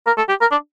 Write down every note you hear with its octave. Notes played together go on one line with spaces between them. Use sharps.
A#4
A4
G4
A#4
D4